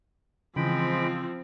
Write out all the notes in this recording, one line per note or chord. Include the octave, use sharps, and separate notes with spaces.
C#3 E3 F3 G#3 C4 G5 B5